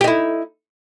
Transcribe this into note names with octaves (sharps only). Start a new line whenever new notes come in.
D#4 E4 G4